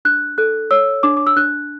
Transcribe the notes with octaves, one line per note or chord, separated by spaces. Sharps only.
D4 F#6
A4 F#6
C#5 E6
D4 D6
D6
E6
D4 F#6